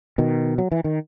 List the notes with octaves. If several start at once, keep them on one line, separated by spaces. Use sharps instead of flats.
B2 D#3
F#3
E3
D#3